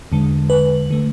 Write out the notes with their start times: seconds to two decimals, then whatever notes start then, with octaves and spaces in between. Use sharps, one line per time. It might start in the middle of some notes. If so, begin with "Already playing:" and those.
0.12 E2 D3 G#3
0.50 B4
0.91 D3 A3